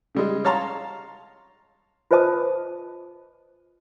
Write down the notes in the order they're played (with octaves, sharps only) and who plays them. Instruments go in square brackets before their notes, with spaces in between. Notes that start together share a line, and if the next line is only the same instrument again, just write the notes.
[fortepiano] C#3 G3 G#3
C#5 F5 A5 A#5 C6
[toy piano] F4 B4 C5 D#5 A5 D#6